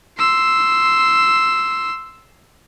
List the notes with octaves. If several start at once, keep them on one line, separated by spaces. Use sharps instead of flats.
C6 E6